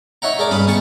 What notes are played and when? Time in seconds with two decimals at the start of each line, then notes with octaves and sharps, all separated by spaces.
0.22 D#4 C#5 E5 F#5 A#5
0.39 G#4 A#4 D5
0.50 G2 C#4 F5 B5 D#6
0.67 D#3 B3 G#4 A5 C#6